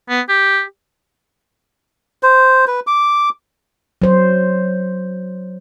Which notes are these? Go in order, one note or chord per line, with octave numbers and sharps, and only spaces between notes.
B3
G4
C5
B4
D6
F#3 C5